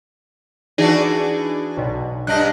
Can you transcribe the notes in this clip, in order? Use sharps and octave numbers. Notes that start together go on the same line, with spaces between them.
E3 D4 D#4 F#4 G#4 D5
B1 B2
G2 D4 D#5 F#6